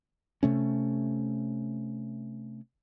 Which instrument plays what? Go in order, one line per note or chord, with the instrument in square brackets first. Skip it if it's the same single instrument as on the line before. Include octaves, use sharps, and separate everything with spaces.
[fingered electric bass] C3 A3 C#4